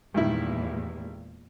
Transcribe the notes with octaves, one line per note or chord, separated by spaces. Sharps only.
E2 G2 A#2 D#3 G#3 E4